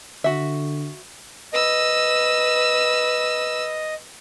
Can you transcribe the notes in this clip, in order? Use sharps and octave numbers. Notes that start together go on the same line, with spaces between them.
D3 F#4 E5
B4 D#5 E6